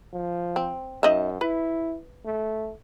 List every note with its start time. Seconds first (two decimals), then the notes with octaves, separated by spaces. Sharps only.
0.13 F3
0.56 C4
1.03 F#2 D#4 D#5 E5
1.41 E4 B4
2.26 A3